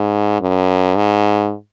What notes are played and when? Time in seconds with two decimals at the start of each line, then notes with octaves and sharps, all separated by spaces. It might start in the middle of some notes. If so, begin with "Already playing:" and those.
Already playing: G#2
0.41 F#2
0.96 G#2